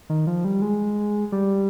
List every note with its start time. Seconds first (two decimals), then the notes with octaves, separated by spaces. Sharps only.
0.10 D#3
0.27 F3
0.44 G3
0.62 G#3
1.32 G3